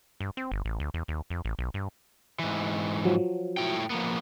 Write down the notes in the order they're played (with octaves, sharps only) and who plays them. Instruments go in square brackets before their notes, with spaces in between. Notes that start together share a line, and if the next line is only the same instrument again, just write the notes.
[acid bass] G2
C4
G1
A1
D2
E2
D#2
F2
A1
B1
G2
[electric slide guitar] G#2 E3
[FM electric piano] F3 F#3
[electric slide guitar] A2 E4 G5
F3 A#3 B3